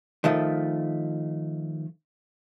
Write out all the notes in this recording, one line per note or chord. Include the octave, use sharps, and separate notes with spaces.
D#3 F3 A3